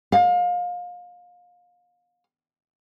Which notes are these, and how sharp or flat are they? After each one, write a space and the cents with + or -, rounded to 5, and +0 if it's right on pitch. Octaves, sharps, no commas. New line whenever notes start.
F5 +30